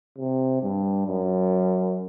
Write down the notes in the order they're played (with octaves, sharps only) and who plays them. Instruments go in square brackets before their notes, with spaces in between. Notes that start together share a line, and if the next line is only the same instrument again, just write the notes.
[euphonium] C3
G2
F#2